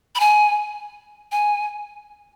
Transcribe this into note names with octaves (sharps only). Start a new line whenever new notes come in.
B5
G#5
G#5